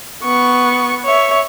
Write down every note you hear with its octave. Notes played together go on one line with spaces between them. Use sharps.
B3 C#6
C#5 E5